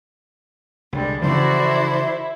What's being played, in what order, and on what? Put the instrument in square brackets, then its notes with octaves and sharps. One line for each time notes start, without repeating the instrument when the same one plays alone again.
[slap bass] C2 [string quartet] D3 G3 G#3
[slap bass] C#3 E3 F3 [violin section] E4 [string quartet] F#4 A4 D5 [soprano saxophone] C5